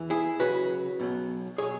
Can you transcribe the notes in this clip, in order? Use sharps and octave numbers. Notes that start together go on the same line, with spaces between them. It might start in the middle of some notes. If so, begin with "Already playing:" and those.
Already playing: E2 E3
E4 G#4
C#2 C#3 F#3 F#4 B4
B1 B2 F#3
B2 F#3 G#4 C#5